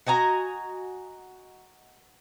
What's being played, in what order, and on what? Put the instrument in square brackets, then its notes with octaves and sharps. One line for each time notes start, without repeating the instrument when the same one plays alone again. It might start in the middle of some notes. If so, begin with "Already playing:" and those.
[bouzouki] F#4 D#5 G#5 A#5